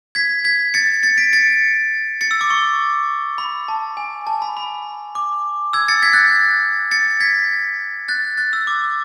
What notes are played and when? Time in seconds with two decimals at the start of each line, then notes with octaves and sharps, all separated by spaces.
0.15 G#6 B6
0.44 G#6 B6
0.74 A6 C#7
1.03 A6 C#7
1.18 B6 D7
1.33 A6 C#7
2.21 A6 C#7
2.31 E6
2.41 D6
2.50 C#6
3.38 B5
3.68 A5
3.97 G#5
4.27 A5
4.42 B5
4.57 B5
5.15 D6
5.73 E6 G#6
5.88 A6 C#7
6.02 G#6 B6
6.13 F#6 A6
6.91 A6 C#7
7.20 G#6 B6
8.08 F#6 A6
8.37 F#6 A6
8.53 E6
8.67 D6